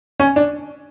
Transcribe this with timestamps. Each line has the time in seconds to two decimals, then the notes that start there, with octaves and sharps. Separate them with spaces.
0.20 C#4
0.36 D4